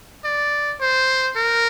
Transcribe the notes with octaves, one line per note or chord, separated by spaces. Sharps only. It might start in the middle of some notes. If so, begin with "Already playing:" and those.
D5
C5
A#4